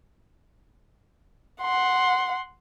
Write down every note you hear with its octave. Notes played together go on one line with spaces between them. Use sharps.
F#5 C6